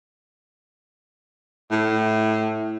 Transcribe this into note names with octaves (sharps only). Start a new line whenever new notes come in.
A2